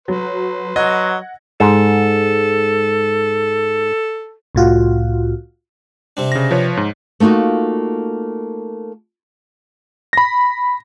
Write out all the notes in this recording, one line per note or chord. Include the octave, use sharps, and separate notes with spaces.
F#3 B4 C6
F#3 D#5 F#5 G#6 A#6
G#2 A4
C2 A2 F4 F#4
C3 C4 D4
C#3 A#6
F3 B4 C#5
G#2
A3 A#3 D#4 F4 F#4
B5 A#6